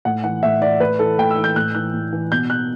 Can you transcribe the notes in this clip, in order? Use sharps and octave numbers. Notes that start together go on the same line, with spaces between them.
A2 F#5
E3 F#5
A2 E5
E3 D5
A2 B4
E3 A4
A2 G5
E6
E3
G6
A2 F#6
E3 F#6
A2
E3
B2 G6
F#6